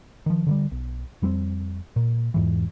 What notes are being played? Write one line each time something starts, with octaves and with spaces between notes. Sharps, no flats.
D#3 F3
D3 D#3 G3
B1
F2 G3 A#3 C4
A#2
E2 G#2 E3